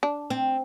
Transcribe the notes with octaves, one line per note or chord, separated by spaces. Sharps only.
D4
C4